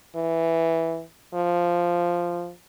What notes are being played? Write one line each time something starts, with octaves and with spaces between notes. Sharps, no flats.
E3
F3